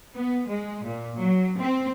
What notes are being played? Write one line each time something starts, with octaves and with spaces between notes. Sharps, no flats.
B3
G#3
A#2
F#3
C4